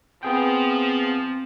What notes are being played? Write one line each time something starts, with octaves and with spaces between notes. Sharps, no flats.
F3 B3 C4 G#4 G5